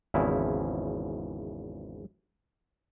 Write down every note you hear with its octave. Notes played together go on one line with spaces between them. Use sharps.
G#1 E2 C#3 F3 E4